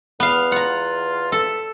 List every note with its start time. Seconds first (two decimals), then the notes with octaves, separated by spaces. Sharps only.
0.20 E2 B3 F5
0.52 F4 F#5 A#5
1.32 A4 E5